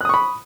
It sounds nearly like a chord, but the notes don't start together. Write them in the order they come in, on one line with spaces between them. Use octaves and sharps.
F#6 D#6 C#6 B5